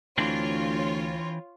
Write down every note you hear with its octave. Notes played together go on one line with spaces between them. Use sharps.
D2 E3 C4 D4 F4 C#5